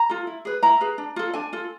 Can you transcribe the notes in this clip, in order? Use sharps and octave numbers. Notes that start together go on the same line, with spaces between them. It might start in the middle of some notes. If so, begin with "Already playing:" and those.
Already playing: A#5
F4 A4
E4
G#4 B4
E4 A#5
G#4 B4
D4
F4 A4
D4 G#5
F4 A4